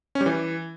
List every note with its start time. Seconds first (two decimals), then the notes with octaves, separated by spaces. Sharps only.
0.15 C#4
0.21 G3
0.26 E3